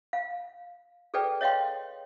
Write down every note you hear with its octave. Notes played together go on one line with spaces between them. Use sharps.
F5
G#4 A4 B4 D5 G5
C#5 D#5 F5 G5 C6